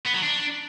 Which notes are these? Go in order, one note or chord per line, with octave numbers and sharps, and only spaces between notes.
B3
F#3
D4